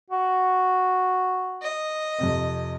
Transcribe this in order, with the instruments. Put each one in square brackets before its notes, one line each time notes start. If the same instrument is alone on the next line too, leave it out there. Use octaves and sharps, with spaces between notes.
[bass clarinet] F#4
[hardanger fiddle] D#5
[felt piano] F2 C3 C4